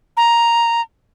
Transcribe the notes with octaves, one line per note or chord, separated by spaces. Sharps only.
A#5